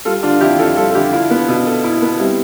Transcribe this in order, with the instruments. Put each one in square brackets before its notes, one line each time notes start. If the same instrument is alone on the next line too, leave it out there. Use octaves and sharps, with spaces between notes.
[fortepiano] G3 [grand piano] F4 A4
[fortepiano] D3 [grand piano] D4 F4
[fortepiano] F2 [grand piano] E4 G4
[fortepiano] F2 [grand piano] F4 A4
[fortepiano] G3 [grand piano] F4 A4
[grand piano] A4
[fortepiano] D3 [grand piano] E4 G4
[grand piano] D4 F4 [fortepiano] E4
[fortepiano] B3
B2
A4
E4
B3
[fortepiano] G3 [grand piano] C4 E4